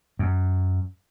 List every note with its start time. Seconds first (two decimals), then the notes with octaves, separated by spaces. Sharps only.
0.19 F#2